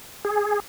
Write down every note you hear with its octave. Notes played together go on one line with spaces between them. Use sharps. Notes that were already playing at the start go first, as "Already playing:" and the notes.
G#4